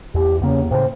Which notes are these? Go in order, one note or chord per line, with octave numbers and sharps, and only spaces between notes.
E2 G4
E2 C#3 A#3
A2 C#3 C5